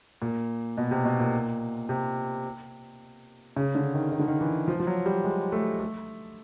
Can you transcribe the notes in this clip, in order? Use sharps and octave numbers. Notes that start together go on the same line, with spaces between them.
A#2
B2
C3
B2
A#2
C3
C#3
D3
D#3
D#3
D3
D#3
E3
F3
F3
F#3
G3
G#3
A3
A3